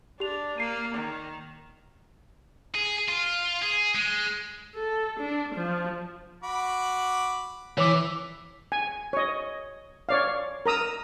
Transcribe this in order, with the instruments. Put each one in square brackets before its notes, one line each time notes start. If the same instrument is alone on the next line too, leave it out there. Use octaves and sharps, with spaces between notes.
[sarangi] D4 [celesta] G4 F7
[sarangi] A#3 [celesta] C7 D#7
[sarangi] D#3
[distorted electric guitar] G#4
F4
G#4
G#3
[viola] A4
D4
F3
[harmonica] F#4 B5 D6
[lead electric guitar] E3 [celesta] C#5 D6
[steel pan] G#5
C#5 D#5
C#5 D5 F5
A#4 A#5 D#6 E6